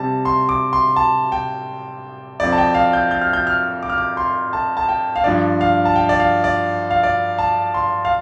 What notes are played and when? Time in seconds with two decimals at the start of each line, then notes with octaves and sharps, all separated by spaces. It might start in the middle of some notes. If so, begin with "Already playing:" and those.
Already playing: C3 G3 C4 A5
0.25 C6
0.49 D6
0.73 C6
0.96 A5
1.32 G5
2.40 F2 F3 C4 D5
2.53 A5
2.58 G5
2.75 F5
2.93 G6
3.11 G6
3.21 F6
3.33 G6
3.47 F6
3.83 D6
3.90 F6
3.98 D6
4.17 C6
4.53 A5
4.77 A5
4.89 G5
5.16 F5
5.24 G2 F3 D4 D5
5.61 F5
5.85 A5
5.96 G5
6.09 D5
6.20 F5
6.44 D5
6.91 F5
7.03 D5
7.39 A5
7.74 C6
8.05 F5